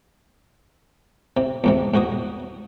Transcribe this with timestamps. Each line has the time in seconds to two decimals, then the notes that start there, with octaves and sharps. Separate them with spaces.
1.37 C3
1.64 E2 G#2 C3
1.94 G#2 B2 F#4 D#6